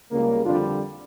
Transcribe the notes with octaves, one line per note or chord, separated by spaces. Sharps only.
C#2 C#3 G3 A#3
F2 D3 G3 D4 F4